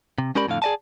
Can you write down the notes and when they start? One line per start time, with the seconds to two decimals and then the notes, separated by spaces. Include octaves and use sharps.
0.18 C3
0.35 G#3 C#4 G4 A#4 D5 B5
0.47 F2 A2 D3 F5
0.62 G#4 D5 D#5 G#5 A5